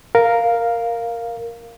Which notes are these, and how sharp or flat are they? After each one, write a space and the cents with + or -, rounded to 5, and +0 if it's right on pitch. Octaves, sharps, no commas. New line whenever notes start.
A#4 +0 F5 +0